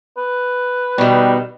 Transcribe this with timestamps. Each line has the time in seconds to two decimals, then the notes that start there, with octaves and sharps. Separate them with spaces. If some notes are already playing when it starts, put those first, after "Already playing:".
0.17 B4
0.98 B2 D#3 G3